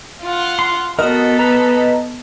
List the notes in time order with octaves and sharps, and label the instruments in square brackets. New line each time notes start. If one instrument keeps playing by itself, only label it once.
[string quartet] F4 F#5
[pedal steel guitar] C6
[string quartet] B3 A4 [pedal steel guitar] F#4 A#4 [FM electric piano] D#5
[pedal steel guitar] B4 A#5